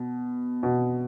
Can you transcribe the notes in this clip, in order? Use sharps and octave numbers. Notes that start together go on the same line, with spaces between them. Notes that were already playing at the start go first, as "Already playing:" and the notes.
Already playing: B2
B2